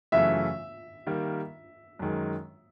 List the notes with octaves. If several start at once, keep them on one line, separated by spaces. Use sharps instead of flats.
F#2 C#3 E3 A3 E5
D#3 G3 A#3
F#2 D#3 G#3